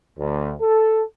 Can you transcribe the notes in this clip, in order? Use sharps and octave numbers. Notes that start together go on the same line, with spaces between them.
D2
A4